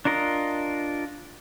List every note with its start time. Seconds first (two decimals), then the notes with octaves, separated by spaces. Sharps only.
0.05 D4 F4 A#4 D#5